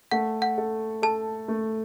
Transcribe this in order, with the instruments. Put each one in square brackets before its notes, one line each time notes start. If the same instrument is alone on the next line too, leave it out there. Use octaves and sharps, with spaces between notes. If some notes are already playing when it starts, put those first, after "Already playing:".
[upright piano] A3 [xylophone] F#5
[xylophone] F#5
[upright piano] A4
[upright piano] A4 [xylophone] A5
[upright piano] A3